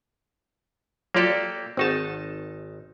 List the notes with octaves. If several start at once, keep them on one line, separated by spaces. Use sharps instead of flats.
F#3 A#3 F4 G4 A4 D5
G#1 C4 D#4 F#4 G#4 A5